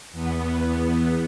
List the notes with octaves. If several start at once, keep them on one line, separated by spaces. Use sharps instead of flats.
E2 B3